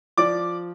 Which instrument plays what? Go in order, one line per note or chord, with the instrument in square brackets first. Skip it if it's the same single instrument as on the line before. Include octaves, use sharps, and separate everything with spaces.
[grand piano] F3 D5 D6